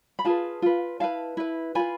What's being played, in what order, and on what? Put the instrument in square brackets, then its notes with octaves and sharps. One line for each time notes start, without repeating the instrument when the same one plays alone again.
[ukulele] B5
F4 G#4 B4 F5 A5
F4 B4
E4 B4 F5 A5
E4 B4
F4 B4 G#5 B5